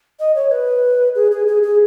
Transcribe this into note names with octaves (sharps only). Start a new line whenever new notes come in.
D#5
C#5
B4
G#4
G#4
G#4
G#4